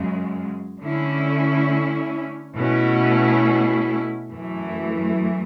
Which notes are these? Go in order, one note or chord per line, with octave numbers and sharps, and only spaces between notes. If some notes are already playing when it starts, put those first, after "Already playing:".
Already playing: F#2 C#3 G#3
D3 A3 C#4 E4
B2 A3 C#4 E4
F#2 E3 A3